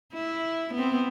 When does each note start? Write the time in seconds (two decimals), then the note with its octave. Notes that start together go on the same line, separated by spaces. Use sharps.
0.14 E4
0.74 B3 C4